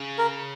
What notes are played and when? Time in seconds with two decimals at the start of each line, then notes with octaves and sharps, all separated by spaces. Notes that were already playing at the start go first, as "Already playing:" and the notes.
Already playing: C#3
0.18 A#4